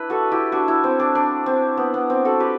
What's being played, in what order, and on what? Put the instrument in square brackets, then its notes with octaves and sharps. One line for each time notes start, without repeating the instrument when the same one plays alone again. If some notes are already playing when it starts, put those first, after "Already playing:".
Already playing: [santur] D4 E4 B4
F#4 A4
E4 G4
D4 F#4
E4
C4
D4
D4
C4
B3
B3
C4
F#4 A4
G4 B4